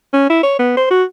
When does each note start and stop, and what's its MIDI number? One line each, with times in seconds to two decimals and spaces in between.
0.13 0.27 61
0.30 0.42 64
0.43 0.55 73
0.59 0.73 59
0.77 0.86 72
0.91 1.04 66